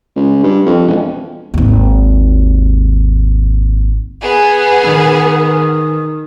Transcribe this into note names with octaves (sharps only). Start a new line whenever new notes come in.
C#2
G2
F2
E1
G#1 D#2
B3 G#4
D#3